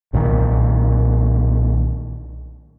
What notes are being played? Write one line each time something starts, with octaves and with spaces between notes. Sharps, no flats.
B1 A#2 D3 D#3